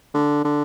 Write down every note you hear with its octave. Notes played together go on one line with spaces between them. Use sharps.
D3
D3